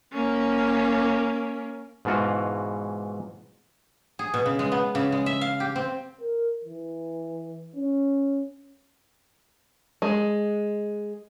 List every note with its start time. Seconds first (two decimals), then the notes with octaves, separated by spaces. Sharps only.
0.12 A#3 C#4
2.05 G#2 B2 E3 F4 F#4
4.19 G#4
4.34 B2
4.46 C#3
4.59 G#3
4.72 B3
4.95 C#3
5.12 G#3
5.26 E5
5.41 F5
5.60 G4
5.76 C4
6.21 A#4
6.64 E3
7.76 C#4
10.02 G#3